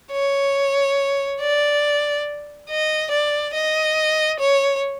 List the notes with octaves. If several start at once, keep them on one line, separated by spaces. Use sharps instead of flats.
C#5
D5
D#5
D5
D#5
C#5